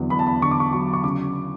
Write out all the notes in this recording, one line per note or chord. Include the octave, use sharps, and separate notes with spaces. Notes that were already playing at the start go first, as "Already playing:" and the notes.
Already playing: E2 D3 F#3
E2 B5
A5
B5
D3 C#6
D6
C#6
F#3 C#6
C#6
C#3 D6